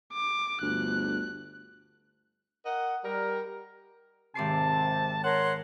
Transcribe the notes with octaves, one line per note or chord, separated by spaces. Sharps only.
D6
G1 D2 F#6
A#4 D#5 F#5
G3 A#4
G#1 C3 A5 D6 C7
A#4 C#5 F#5 C6